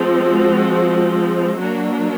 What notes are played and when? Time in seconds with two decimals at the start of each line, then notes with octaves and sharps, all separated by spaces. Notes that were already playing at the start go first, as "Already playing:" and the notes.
Already playing: F3 G#3 C4
0.23 F#4
1.58 F#3 A#3 D4 F#4